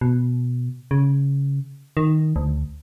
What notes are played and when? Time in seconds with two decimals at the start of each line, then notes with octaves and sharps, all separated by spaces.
0.01 B2
0.91 C#3
1.97 D#3
2.36 D2